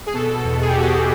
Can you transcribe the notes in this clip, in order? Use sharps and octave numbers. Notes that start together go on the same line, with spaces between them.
G#4
B2 A4
E2
G#4
G4
E2 F#4
G4